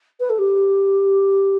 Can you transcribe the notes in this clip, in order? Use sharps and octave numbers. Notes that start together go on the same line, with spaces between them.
B4
A4
G4